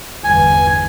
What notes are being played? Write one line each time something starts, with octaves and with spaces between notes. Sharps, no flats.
G1 E2 G#5